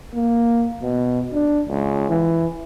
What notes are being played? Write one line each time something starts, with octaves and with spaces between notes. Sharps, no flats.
A#3
B2
D4
C#2
E3